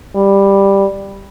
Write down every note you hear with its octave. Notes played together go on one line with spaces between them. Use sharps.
G3